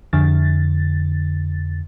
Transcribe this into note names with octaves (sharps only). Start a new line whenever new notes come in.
F2 D3 A6